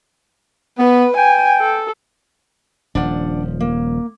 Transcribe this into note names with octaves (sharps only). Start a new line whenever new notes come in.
B3 B4
G5 G#5
A4
D#1 F3 D4 F#5
A#3